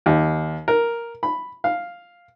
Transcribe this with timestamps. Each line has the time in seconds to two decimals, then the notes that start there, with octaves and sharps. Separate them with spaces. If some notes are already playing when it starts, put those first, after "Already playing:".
0.06 D#2
0.68 A#4
1.23 B5
1.64 F5